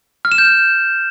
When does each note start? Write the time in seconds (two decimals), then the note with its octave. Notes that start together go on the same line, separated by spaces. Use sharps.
0.25 F6
0.32 E7
0.38 G6
0.45 E7